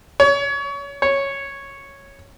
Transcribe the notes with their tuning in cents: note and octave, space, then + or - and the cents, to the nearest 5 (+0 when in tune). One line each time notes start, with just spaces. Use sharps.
C#5 +30
C#5 -5